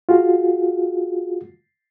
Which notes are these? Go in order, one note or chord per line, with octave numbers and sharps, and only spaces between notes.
F4 F#4 G#4